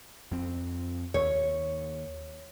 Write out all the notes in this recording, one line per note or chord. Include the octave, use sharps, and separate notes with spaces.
F2 C4
D#2 C#5